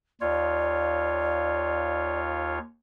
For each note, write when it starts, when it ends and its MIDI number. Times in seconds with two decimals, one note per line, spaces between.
0.21 2.59 39
0.21 2.59 65
0.21 2.59 73
0.21 2.19 74